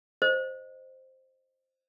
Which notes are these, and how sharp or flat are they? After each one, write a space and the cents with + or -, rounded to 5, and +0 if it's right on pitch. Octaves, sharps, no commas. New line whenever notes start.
C5 +0 D#5 -10